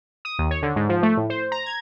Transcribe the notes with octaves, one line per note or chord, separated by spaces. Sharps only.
D#6
D#2
C#5
D3
G#2
F3
A3
A2
C5
A#5
G#6